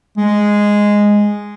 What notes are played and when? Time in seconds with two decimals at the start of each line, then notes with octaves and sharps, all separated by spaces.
0.17 G#3